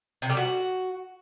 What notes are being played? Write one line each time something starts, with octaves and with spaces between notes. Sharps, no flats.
C3
G3
F#4